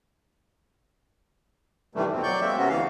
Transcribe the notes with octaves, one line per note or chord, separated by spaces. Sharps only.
G2 C3 D#3 E3 G3 A3
F2 B2 C4
F#3 D5 C#6 G6
G#3 A#3 C4 E5
C3 B3 C#4 F#4
D2 E3 F5